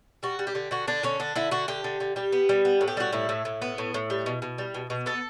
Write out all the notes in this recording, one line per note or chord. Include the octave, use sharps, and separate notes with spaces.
G3 F#4
G3
G4
D3
D3 F#4
D3 D4
D3 C#4
D3 D4
D3 E4
D3 F#4
D3 G4
D3
D3
G3 G4
B3
G3
B3
A2
G4
G3 F#4
A2 E4
A2
A2
B3
A2
A2
G3
B2
B2
G3
B2
B2
B3 A4